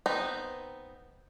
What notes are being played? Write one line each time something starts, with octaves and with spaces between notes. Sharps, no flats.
B3 C4 D#4